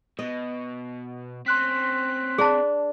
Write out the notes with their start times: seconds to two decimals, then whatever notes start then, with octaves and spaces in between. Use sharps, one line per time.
0.19 B2 D#5
1.46 C4 C#4 C6 F#6 B6
2.38 D4 G#4 A5